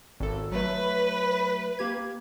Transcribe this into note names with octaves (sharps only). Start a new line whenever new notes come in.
G#1 A4
F#3 A3 B4
A#3 G4 G#6